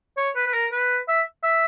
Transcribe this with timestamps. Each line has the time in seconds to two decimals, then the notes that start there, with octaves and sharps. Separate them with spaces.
0.17 C#5
0.36 B4
0.47 B4
0.54 A#4
0.72 B4
1.08 E5
1.44 E5